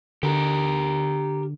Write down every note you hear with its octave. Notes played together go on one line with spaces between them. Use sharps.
D3 G4 A#4